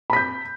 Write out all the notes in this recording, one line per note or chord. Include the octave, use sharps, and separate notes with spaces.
B5 G6 B6